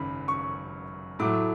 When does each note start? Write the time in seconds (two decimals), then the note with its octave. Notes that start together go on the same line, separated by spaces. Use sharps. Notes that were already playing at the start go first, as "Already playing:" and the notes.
Already playing: G#1 F#2 C#3 B5
0.28 C#6
1.19 A2 F#3 A3 D6